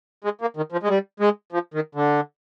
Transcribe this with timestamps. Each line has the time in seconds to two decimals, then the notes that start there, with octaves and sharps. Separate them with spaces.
0.24 G#3
0.41 A#3
0.57 D#3
0.72 F3
0.83 G#3
0.89 G3
1.20 G#3
1.52 F3
1.74 D#3
1.95 D3